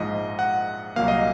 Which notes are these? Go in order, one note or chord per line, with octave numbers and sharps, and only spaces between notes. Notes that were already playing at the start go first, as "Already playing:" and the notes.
Already playing: A#1 G#2 F3 D#5
F#5
C2 A#2 F#3 A#3 F5
D#5